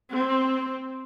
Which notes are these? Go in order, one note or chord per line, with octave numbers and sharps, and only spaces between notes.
C4